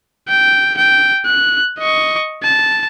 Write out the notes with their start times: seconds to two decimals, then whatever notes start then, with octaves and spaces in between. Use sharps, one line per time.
0.28 G5
0.77 G5
1.26 F#6
1.79 D#5 C#6
2.44 A5